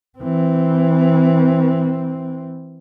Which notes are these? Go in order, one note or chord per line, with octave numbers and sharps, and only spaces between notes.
E3 C4